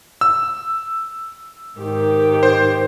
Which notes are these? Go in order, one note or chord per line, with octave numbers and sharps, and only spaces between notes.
E6
G#2 D#3 G4
C5